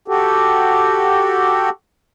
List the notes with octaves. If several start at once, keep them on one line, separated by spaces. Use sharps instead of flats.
F#4 G4 A4